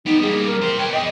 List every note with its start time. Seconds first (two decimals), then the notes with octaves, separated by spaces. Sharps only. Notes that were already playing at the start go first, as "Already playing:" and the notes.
0.06 B3 D#4 G4
0.22 G3 A#3 G#4
0.46 A#4
0.62 G4 C5
0.78 B4 C#5 G5
0.93 G#4 D5 D#5